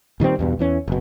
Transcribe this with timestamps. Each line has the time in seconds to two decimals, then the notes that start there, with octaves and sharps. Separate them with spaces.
0.20 A#2 D#3 G3 C4
0.39 E2 G2 B2
0.59 E2 E3 C#4
0.88 F#1 B2